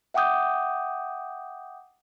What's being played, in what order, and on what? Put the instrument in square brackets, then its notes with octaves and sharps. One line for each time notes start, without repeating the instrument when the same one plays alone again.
[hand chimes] E5 F#5 G5 D6 D#6 G6